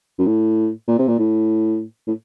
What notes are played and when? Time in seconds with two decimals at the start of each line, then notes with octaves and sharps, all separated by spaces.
0.19 F#2
0.26 A2
0.88 A#2
0.99 C3
1.08 A#2
1.19 A2
2.07 A2